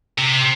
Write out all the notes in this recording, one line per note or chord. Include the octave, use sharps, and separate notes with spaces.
C3